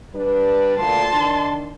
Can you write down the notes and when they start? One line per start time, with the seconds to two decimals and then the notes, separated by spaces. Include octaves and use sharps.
0.14 G3 D4 B4
0.77 D2 A#2 A5 C6
1.12 D#3 D4